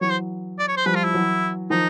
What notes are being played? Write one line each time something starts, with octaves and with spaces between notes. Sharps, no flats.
E3 F#3 C#5
C5
D5
C#5
C5
F3 G3 B4
F4
E4
E3 F#3
D#3 F3 D#4